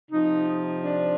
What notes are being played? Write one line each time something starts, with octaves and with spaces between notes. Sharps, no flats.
C3 F3 D#4
D4